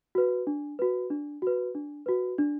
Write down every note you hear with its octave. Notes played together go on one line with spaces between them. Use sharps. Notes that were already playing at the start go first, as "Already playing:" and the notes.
F#4 B4
D4
F#4 B4
D4
F#4 B4
D4
F#4 B4
D4